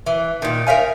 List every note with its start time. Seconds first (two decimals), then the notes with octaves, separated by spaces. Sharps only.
0.06 E3
0.42 A#2 D#3
0.67 A#4 E5 F5 G#5